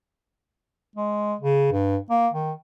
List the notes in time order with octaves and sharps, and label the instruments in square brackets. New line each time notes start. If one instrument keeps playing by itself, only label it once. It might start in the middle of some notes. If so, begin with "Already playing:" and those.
[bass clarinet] G#3
C#3
G2
A#3
D#3